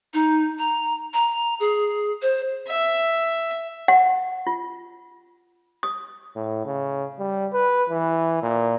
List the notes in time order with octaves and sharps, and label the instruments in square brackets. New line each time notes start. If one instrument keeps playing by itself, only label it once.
[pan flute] D#4
A#5
A#5
G#4
C5
[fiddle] E5
[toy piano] F#5
F4
D#6
[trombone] A2
C#3
G3
B4
E3
A#2